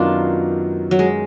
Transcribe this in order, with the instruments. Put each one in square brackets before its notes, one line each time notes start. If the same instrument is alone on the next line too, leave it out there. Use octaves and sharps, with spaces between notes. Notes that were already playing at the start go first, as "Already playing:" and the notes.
Already playing: [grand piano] F#2 D#3 F#3 B3 D#4 [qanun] D4 F4
[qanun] F#3
G#3